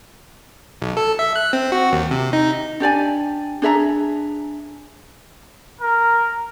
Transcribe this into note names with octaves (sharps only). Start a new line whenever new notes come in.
B1
A4
E5
F#6
C4
F#4
D#2
C3
D#4
D4 G4 D5 G#5
D4 G#4 E5 A#5
A#4